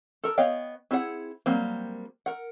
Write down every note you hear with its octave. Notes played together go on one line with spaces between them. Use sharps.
A4 A#4
B3 C#5 D#5 F5 G5
C4 E4 G#4 B4 F#5
F#3 G3 A#3 C4
A#4 F#5